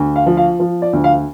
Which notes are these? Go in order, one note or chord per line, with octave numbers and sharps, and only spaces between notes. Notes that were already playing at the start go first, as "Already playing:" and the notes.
Already playing: D2
F5
F3
F5
F3
D5
D2
F5